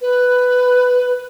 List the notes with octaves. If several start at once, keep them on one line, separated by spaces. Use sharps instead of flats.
B4